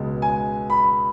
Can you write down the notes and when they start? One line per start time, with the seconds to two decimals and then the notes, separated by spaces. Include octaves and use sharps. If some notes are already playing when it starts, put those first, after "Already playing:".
Already playing: C#2 B2 G#3
0.22 G#5
0.70 B5